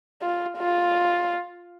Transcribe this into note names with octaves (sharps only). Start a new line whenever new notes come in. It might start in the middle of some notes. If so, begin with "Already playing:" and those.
F4
F4